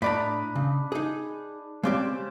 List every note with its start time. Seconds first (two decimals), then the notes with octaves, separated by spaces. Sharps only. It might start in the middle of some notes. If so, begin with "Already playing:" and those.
0.02 A2 D4 D5 D#5 A#5 B5
0.55 C#3
0.92 D#4 G#4
1.83 C#3 G#3 C4 G4 C5 D5